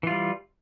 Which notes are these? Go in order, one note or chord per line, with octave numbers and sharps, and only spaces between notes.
E3 G3 F4